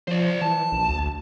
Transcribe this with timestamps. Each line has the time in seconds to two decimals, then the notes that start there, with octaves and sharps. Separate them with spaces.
0.08 F3 C5 D5
0.41 E3 A5
0.72 A#1
0.88 D2